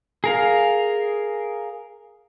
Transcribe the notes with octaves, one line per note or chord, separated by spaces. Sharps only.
G#4 A#4 F5